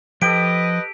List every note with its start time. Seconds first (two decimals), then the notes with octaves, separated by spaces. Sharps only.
0.22 F3 G4 A4 B4 D#5 G5 D7